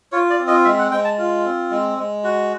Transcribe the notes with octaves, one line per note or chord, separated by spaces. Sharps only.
F4 C#5
D5
C4
D#5
G#3 E5
F#5
G#3 G5
A5
F4
C4
G#3
G#3
F#4